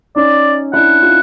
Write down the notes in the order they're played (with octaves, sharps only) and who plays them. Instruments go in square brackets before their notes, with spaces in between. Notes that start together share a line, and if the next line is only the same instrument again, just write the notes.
[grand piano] C#4 D#4 [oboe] D5
[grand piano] D4 E4 [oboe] F#5
[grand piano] D#4 F4